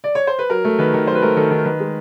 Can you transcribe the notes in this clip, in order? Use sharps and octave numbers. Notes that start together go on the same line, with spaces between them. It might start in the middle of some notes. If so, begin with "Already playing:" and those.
D5
C#5
C5
B4
F#3 A#4
A3
D#3 B4
D#3
F#3 C5
B4
A3 A#4
D#3 A4
D#3 A#4
D#3 B4
G#3